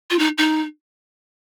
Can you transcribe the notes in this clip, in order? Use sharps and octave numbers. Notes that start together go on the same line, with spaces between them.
F4
D#4
D#4